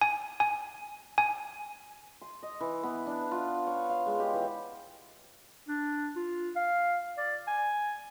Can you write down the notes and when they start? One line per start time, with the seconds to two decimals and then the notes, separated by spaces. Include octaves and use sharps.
0.01 G#5
0.40 G#5
1.18 G#5
2.21 C6
2.43 D#5
2.61 E3
2.83 B3
3.07 D4
3.31 F4
3.67 C#5
3.89 F5
4.06 G#3
4.20 G4
4.34 E3
5.68 D4
6.16 F4
6.56 F5
7.18 D5
7.47 G#5